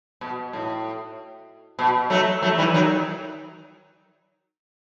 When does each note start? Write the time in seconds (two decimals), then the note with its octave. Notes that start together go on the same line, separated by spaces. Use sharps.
0.21 B2
0.53 A2
1.79 B2
2.10 F#3 A3
2.42 F#3 A3
2.58 E3 G3
2.74 D#3 F#3